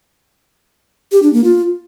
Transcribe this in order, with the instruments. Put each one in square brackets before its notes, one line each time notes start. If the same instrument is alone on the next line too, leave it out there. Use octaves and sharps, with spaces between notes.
[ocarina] G4
D4
A#3
F4